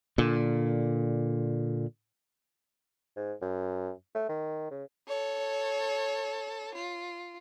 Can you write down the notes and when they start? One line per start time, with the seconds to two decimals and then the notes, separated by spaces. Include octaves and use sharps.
0.18 A#2 D3
3.16 G#2
3.42 F#2
4.15 A3
4.29 D#3
4.71 C#3
5.08 A4 C#5
6.75 F4